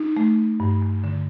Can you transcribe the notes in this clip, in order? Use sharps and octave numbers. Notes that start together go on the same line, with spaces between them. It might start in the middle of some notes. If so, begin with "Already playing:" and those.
Already playing: D#4
A3
G2
D3